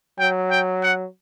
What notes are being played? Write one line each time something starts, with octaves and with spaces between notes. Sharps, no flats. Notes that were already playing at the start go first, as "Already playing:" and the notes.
F#3 G5
G5
F#5